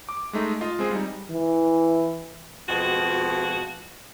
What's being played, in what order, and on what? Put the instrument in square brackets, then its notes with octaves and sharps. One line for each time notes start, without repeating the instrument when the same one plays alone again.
[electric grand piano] D6
G#3 A3 D#4
F4 D#5 F5
G#3 C4 G#4
G3 D#4
[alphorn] E3
[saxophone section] F2 B2 G#3 F4 F#4